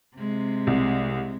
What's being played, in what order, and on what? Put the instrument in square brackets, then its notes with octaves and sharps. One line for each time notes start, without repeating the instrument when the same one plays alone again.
[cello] C3 G#3
[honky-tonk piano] C2